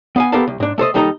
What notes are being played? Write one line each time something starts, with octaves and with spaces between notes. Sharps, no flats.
B3 F5 G#5
B3 G4 A4 A#4 F5 A5
C2
G#2 D4
A3 A4 C5 D#5
D#2 G3 D#4 A4 D#5 A#5